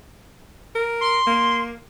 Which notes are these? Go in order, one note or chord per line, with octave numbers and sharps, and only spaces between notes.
A#4
C6
A#3